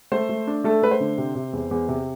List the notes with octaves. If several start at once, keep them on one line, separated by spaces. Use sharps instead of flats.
A3 C5
A3
D4
A3 A4
A3 B4
C5
D3
C3
C3
E2
E2
C3